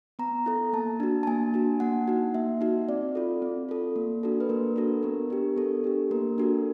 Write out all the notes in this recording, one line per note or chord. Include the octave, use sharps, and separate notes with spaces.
B3 A#5
E4 A4
A#3 A5
D4 F#4
A5
A#3 G#5
D4 F#4
A#3 F#5
D#4 F#4
A#3 E5
D#4 F#4
C4 D5
F4 A4
C4
F4 A4
A#3
D4 F#4 A4
B4
A#3 A#4
D4 F#4 A4
B3 A#4
D4 G4
B3 A4
D4 G4
A#3 A#4
D4 F#4 A4